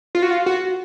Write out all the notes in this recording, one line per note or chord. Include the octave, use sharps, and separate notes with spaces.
F4
F#4
F4
F#4